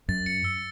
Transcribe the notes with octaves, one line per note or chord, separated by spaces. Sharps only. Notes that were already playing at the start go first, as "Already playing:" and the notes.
F#2 A6
C#7
E6